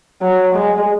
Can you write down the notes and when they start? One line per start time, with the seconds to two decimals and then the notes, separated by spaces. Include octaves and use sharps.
0.22 F#3
0.55 G#3